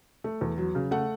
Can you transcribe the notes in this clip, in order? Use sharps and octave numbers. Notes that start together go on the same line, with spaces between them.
A3
E2
F#3
C#3
A3 F#5